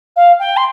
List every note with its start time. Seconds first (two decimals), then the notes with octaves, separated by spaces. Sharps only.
0.16 F5
0.39 G5
0.57 C6